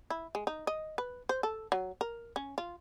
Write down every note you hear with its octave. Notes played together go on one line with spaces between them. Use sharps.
E4
G#3
D#4
D#5
B4
C5
A4
F#3
A#4
C#4
F4